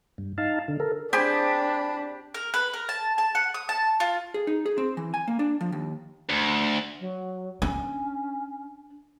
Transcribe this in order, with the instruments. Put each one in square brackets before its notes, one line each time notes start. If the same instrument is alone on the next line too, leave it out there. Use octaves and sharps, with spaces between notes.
[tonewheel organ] G2
D#4 F5 A5
D3
A4 A#4
[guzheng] C4 G#4 [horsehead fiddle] D4 [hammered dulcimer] G4 [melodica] A5 B5
[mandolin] A#4
B4
A#4
A5
A5
F#5
D#6
A5
F4
[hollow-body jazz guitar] G#4
D#4
G#4
C4
E3
G#5
A#3
D4
F3
D#2
[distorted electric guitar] D2
[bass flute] F#3
[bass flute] C#4 [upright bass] D4